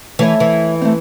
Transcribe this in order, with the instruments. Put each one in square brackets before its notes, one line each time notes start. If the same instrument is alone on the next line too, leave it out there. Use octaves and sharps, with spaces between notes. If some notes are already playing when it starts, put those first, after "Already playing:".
[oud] E3 [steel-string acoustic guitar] A3 C#5 E5
[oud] E3
[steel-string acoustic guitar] A3 C4